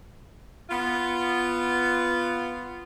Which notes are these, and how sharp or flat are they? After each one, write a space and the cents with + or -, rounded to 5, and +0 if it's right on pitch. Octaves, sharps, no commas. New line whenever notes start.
B3 +0 F4 -10